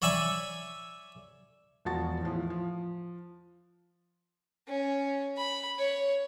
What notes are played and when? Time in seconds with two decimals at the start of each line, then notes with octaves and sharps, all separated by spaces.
0.02 C#5 D5 E5 G#5 B5 C#6
1.85 E1 F3 F#4 A5 A6
2.21 E2 A2 F3
2.50 F3
4.68 C#4
5.37 B5
5.78 C#5